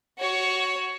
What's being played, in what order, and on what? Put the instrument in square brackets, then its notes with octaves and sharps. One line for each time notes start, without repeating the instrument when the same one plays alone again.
[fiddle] F#4 C#5